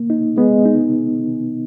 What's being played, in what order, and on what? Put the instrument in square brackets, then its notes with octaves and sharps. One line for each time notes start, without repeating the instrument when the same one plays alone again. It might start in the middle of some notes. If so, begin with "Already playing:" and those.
Already playing: [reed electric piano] A#3
D#4
[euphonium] G#3 [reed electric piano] B3
[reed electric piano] D#4